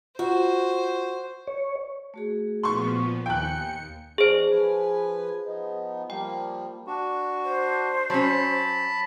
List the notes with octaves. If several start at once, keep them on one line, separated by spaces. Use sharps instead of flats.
F4 F#4 C5
C#5
A3 F#4 G#4
A#2 F3 B3 C6 C#6
D#2 F5 G5 G#5 A#5 F#6 C#7
E2 G#3 D4 G#4 C5
F3 B4 G#5
F3 B3 D#4
F3 G3 A#3 G5
D4 F#4
C5
F#3 C#4 A5 B5